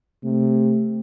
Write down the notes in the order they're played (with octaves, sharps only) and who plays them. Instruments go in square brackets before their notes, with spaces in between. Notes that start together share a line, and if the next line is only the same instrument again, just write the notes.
[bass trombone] C3 [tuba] A3